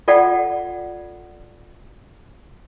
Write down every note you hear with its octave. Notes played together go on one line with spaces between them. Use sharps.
F4 A4 D5 F#5 G5